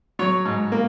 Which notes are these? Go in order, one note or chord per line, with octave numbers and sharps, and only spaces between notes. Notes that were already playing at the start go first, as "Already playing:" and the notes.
F#3 C#5
G#2
A#3